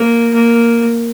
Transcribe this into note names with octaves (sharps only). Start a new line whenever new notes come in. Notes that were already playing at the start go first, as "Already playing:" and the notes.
Already playing: A#3
A#3